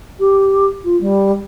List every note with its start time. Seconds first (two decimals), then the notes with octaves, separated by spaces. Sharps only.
0.19 G4
0.84 F4
1.00 G3